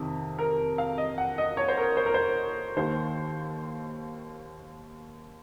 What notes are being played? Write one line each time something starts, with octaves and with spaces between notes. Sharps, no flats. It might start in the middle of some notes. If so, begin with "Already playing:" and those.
Already playing: F2 C3 D#3
A#4
F5
D#5
F#5
D#5
C#5
C5
A#4
C5
A#4
C5
D#2 D#3 C5